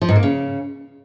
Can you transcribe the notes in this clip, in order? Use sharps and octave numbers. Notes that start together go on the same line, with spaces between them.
F3
G#2
A#3
C#3